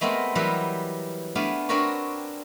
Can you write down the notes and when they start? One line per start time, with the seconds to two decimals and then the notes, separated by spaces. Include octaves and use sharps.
0.01 G#3 A3 B3 C4 A#4
0.35 E3 F#3 G3 G4 A#4 B4
1.35 A3 B3 D4 D5 F5 G#5
1.69 C4 D4 F#4 A#4 B4 C#5